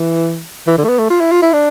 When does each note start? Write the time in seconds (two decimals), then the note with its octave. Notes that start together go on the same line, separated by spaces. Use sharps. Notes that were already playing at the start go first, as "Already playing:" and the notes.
Already playing: E3
0.67 E3
0.78 D3
0.84 A3
0.88 B3
0.99 A3
1.10 F4
1.20 E4
1.31 F4
1.42 E4
1.52 D4